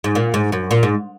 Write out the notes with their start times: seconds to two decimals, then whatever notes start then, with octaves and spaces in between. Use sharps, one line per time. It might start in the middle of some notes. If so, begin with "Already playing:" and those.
0.04 G#2
0.15 A#2
0.34 G#2
0.52 F#2
0.71 A#2
0.83 G#2